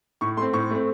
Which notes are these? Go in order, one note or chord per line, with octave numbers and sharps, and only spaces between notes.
A2 C#6
A3 C4 C6
A2 C#6
A3 C4